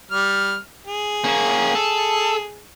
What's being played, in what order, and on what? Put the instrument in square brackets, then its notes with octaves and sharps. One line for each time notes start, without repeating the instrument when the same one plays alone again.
[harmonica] G3 F6
G#4
[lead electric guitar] A#3 C#4
A4